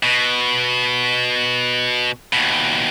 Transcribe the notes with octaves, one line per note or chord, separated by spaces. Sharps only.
B2
D#2 B2